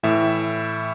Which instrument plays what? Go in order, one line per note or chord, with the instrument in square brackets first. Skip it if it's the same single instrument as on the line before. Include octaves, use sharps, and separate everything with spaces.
[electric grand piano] A2 E3 E5